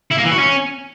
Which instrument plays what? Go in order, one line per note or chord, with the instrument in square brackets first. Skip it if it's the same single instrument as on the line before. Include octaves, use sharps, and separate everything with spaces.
[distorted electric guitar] E4
A#3
E3
F#4
C#4